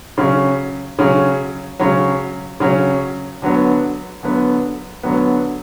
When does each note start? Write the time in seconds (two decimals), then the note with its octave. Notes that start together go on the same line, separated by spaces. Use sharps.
0.18 C#3 F#3 C#4
0.99 C#3 F#3 C#4
1.79 C#3 F#3 C#4
2.60 C#3 F#3 C#4
3.42 D3 F#3 B3
4.23 D3 F#3 B3
5.03 D3 F#3 B3